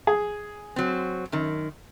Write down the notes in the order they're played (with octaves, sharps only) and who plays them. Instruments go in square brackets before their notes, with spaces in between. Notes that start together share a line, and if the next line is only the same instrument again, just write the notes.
[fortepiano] G#4
[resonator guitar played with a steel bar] F#3 C4
F#2 D#3